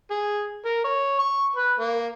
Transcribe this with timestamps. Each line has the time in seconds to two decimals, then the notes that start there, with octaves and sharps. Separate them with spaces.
0.11 G#4
0.65 A#4
0.84 C#5
1.19 C#6
1.56 B4
1.79 A#3